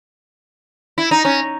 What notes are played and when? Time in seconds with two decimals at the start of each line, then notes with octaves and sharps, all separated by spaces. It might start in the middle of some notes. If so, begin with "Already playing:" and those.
0.98 E4
1.11 D#4
1.25 C#4